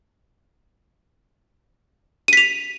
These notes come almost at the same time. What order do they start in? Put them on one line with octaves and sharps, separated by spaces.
D#7 B6 F7